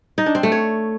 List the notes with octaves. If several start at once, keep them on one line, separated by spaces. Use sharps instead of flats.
D#4
D4
C4
A3
C#5